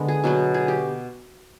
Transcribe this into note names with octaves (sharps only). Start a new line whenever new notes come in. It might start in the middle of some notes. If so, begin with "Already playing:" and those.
Already playing: D3 G#3 B3
G#4
B2 F#3 B3
G#4
G4